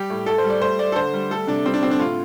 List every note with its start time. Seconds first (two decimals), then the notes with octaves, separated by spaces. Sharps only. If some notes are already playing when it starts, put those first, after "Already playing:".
Already playing: G3 G4
0.10 A2
0.26 A2 A4
0.38 C5
0.44 G3
0.50 D5
0.62 A3 C5
0.79 A3 D5
0.92 A4
0.96 D3 C5
1.14 G3
1.30 A3 A4
1.47 C3 D4
1.65 G3 C4
1.74 D4
1.82 D3 C4
1.91 D4
1.99 A2 F4